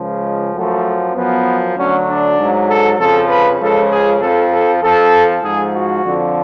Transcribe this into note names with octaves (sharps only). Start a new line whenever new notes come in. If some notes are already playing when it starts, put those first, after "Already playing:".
Already playing: C#2 C#3 F3
G#3
F#2 F3 A3
F#2 F3 B3
D2 D3 F#3 C#4
D4
G#2 F#3
A4
F2 C#3 F3 A4
B4
C#2 C#3 F3 A4
G#4
F2 F3 A4
A4
F2 F3 A4
G#2 F3 G#4
F#4
F2 D3 F3